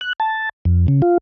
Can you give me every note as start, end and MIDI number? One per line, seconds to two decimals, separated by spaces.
0.01 0.13 90
0.20 0.49 81
0.65 0.87 41
0.88 1.02 49
1.02 1.18 65